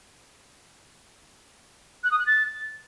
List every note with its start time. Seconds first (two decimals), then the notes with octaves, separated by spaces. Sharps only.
2.04 F#6
2.11 D#6
2.19 F#6
2.26 A6